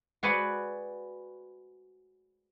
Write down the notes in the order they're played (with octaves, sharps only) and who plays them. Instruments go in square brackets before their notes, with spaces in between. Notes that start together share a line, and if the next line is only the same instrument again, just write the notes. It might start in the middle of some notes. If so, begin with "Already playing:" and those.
[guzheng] F#4 G#4 B4 C5 D5 F#5